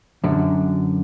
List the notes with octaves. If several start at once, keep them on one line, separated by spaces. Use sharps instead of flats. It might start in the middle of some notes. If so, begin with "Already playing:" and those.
F#2 D3